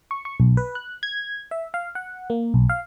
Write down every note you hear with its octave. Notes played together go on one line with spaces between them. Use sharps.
C#6
C#6
B1
B4
F#6
G#6
E5
F5
F#5
A#3
B1
F5